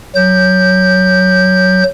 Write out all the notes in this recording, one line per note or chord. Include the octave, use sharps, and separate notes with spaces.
F#3 G6